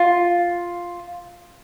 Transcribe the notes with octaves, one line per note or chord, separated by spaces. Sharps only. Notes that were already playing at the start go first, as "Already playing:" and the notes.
Already playing: F4